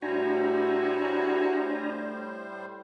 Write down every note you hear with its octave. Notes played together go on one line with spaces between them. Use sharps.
A2 G3 D4 E4 F#4 C5 G#5 A#5